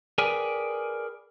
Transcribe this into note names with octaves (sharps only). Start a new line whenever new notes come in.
G#4 A#4 B4 D5 G5 G#5